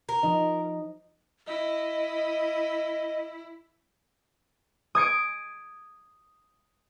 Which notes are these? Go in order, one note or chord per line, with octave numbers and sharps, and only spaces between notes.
A#4
F3 D#4 D#5
E4 D#5
D#6 G#6 C#7 D7